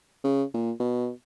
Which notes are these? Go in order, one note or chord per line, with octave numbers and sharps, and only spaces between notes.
C#3
A#2
B2